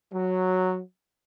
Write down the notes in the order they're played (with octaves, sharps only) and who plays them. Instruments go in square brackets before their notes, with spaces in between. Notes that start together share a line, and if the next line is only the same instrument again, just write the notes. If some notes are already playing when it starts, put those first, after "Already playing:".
[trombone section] F#3